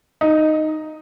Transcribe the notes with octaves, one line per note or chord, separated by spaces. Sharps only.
D#4